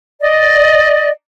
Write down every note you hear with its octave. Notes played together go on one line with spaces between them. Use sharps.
D5 D#5